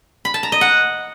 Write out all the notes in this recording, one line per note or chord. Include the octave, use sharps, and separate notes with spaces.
B5
A5
A#5
D#5
F#5